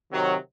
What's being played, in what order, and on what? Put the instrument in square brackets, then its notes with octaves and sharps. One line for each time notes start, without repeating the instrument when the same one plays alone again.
[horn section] C3 D#3 F#3